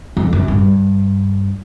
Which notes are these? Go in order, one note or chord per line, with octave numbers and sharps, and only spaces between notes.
F2
F#2
G2